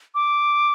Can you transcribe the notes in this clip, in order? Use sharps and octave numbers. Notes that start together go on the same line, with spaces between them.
D6